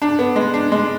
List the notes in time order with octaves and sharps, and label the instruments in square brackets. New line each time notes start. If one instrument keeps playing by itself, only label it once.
[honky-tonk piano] D4
B3
G#3
D4
G#3